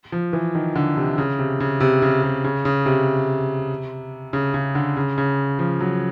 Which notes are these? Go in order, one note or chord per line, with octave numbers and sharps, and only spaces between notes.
F3
E3
D#3
D3
C3
C#3
C3
C#3
C3
C#3
C3
C#3
C#3
C3
C#3
C#3
D3
C#3
C#3
F3
F#3